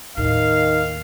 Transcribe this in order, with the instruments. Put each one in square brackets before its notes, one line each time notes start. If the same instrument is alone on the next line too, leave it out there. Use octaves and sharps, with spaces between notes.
[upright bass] D#2 A2 [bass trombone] D#3 [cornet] F5